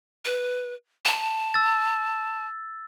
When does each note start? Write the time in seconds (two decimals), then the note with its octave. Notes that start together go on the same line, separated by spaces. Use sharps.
0.25 B4
1.05 A5
1.54 E6 A6